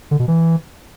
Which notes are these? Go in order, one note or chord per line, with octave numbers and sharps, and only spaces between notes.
D3
B2
E3